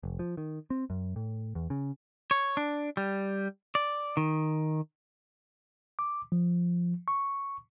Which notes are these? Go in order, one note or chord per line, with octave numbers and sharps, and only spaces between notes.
F1
F3
D#3
C4
F#2
A2
E2
C#3
C#5
D4
G3
D5
D#3
D6
F3
C#6